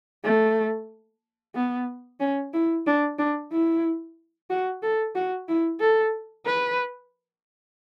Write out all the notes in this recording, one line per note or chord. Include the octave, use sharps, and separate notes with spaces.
A3
B3
C#4
E4
D4
D4
E4
F#4
A4
F#4
E4
A4
B4